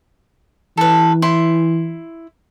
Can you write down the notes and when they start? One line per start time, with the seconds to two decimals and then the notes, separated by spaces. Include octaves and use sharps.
0.77 E3 A4 B4
1.22 E4 C6